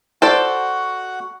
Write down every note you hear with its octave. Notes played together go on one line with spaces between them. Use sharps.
F#4 A4 C5 D5 F#5